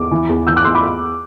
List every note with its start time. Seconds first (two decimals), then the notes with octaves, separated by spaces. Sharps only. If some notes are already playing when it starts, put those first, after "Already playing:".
Already playing: E2 D6
0.11 E3
0.29 E2
0.47 E3 E6 G6
0.56 D6 F#6
0.65 E2 C6 E6
0.75 B5 D6